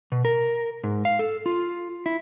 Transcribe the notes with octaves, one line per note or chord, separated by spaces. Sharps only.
B2
A#4
G#2
F5
A4
F4
E4